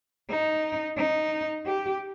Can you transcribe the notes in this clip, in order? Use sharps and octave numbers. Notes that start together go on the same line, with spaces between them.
D#4
D#4
G4